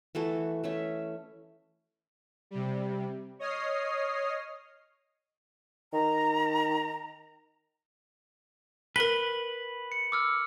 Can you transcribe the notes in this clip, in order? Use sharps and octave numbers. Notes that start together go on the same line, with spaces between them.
E3 A3 F#4 A4
A3 C#4 E5
C3 G3
C#5 D#5 D#6 F6 C7
D#3 A#5
A#4 B4 F#7 G7
C#7
D6 E6 F6